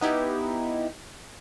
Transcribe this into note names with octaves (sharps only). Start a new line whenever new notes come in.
B3 D#4 E4 G4